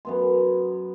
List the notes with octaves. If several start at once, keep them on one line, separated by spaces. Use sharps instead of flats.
F#2 B3 C6